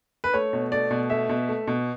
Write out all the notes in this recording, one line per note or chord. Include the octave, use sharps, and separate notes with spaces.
B4
A3 C#5
B2
A3 D5
B2
A3 E5
B2
A3
B2